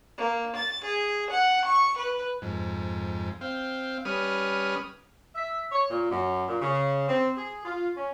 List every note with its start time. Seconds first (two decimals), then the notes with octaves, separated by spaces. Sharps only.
0.16 A#3
0.54 A6
0.84 G#4
1.30 F#5
1.65 C#6
1.97 B4
2.42 F2 G#2
3.41 C4 F5 G5
4.05 G3 C#4 B4 D#6 F6
5.35 E5
5.71 C#5
5.89 A#2
6.09 F#2
6.47 A#2
6.60 C#3
7.07 C4
7.36 G#4
7.64 F4
7.95 C#4